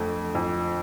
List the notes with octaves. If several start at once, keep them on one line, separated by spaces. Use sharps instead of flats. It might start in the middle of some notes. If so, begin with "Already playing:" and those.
Already playing: F2 D3 A3
F2